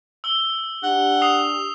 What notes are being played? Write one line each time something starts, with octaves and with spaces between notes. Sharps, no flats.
E6 G7
D4 G4 F#5
D#6 C7 F7